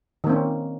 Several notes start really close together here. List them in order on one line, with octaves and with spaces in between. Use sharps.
D#3 A#3 C4 C#4